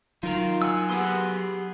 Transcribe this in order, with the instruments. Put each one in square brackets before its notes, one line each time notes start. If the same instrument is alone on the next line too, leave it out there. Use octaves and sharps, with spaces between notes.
[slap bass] F#3 [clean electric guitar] D#4 A#4 A#5 [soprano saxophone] F4
[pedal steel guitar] F#5 G#5 E6
[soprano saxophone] B3 [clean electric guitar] G4 G#4 C6